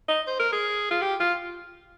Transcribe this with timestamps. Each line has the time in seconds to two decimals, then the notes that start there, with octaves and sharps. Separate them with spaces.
0.09 D#5
0.27 C5
0.39 A#4
0.52 G#4
0.91 F4
1.02 G4
1.20 F4